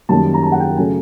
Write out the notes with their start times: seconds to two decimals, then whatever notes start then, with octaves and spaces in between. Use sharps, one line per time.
0.09 F#2 D#3 G3 A#3 A5
0.34 A#5
0.43 A5
0.52 F#5
0.60 G5
0.77 C#3 F#3 A3 G#5